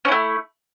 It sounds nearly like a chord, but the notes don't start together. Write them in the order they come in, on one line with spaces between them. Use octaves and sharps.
C#4 E4 A3